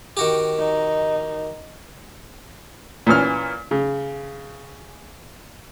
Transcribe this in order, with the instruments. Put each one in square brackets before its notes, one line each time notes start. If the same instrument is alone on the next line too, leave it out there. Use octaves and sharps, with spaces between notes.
[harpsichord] D#3 F#4 G4
[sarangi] D#4
[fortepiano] A#2 E3 C#4 F6
C#3